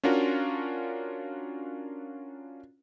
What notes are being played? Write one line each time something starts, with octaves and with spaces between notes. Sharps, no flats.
C#4 D4 F4 F#4 A#4